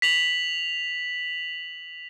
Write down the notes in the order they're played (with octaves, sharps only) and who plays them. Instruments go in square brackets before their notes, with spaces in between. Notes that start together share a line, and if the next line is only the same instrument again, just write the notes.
[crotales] B6 F7 F#7